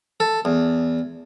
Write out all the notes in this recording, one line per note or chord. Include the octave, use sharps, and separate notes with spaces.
A4
E2